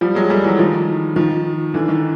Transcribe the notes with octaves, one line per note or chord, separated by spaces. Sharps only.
F3 G3
F#3 G#3
G3 A3
E3 F#3
D#3 F3
D#3 F3
D3 E3
D#3